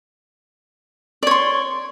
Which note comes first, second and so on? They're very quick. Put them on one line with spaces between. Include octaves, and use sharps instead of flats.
D5 C#5 C6